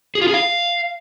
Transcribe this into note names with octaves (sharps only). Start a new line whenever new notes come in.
G#4
F4
G#4
F5